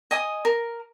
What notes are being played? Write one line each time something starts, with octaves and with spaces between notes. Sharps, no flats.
D#5 G#5 D#6
A#4